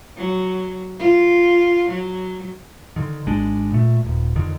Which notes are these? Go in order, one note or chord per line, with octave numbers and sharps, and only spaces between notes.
F#3
F4
F#3
D3 D#3
G#1 G#3 D4
A#2 A3
D#1
F2 D3 D#3